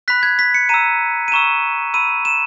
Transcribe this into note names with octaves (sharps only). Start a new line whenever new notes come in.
B5 F#6 B6
G#6
B6
C#7
A#5 E6 D#7
D#7
A#5 C#6 E6 E7
B5 E6 D#7
E7